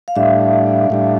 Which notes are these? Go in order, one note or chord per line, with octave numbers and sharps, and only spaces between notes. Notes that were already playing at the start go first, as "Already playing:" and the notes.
F5
A2 G3 D4 E5
A2 G3 D4